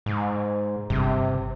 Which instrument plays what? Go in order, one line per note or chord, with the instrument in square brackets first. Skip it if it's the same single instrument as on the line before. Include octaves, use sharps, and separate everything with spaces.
[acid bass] G#2
[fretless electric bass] G1 G2 [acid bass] C3